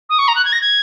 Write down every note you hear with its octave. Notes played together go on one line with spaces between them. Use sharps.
D#6
C#6
A#5
F#6
G#6
A#6
G#6